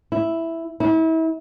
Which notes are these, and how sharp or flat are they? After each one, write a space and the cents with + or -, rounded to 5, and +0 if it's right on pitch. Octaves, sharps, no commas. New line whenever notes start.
E4 +0
E4 -35